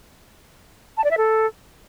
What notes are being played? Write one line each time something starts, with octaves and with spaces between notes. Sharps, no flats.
A5
D5
E5
A4